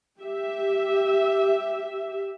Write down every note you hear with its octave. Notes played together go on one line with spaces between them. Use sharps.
G4 E5